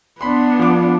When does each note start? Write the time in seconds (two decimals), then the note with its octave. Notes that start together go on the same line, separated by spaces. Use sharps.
0.21 B3 D4 B5 C6
0.59 F3 D6